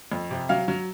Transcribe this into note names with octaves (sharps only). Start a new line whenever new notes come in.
F2
C3
F#3 F5
F#3